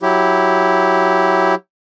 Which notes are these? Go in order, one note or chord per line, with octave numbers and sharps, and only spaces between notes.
F#3 E4 G4